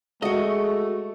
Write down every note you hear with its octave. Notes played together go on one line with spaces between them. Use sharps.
G#3 A3 F#4 D#5